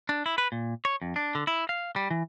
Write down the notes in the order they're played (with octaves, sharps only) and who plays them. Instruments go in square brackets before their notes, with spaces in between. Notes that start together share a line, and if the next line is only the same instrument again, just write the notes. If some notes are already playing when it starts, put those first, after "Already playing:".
[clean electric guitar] D4
E4
B4
A#2
C#5
F2
D4
D3
E4
F5
G3
E3